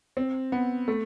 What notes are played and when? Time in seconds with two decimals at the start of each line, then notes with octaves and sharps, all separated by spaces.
0.17 C4
0.52 B3
0.88 A3